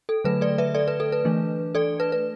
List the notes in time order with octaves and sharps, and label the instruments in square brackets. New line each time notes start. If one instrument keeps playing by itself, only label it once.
[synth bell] A4
D3 F#3 A3 B4
A4 D5
B4 E5
A4 D5
B4
A4
B4
E3 A3 D4
A4 D5
B4
B4